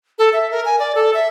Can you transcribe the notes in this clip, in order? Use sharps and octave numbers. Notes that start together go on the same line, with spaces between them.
A4
E5
A#4
G#5
D5
A4
E5